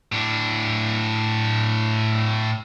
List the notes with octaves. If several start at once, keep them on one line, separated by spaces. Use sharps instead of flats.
A2 D4